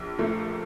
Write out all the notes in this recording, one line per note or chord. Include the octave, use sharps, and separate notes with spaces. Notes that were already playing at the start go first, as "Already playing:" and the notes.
Already playing: A#1
A#2 F3 A3